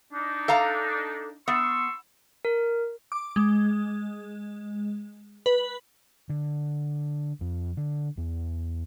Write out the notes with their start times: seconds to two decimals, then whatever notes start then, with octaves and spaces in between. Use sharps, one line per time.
0.13 D4 D#4
0.48 A4 F5 A#5
1.48 B3 C6 C#6 E6
2.45 A#4
3.12 D6
3.36 G#3
5.46 B4
6.29 D3
7.41 F2
7.77 D3
8.17 E2